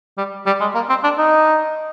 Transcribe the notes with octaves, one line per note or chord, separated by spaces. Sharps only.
G3
G3
G#3
A#3
C4
D4
D#4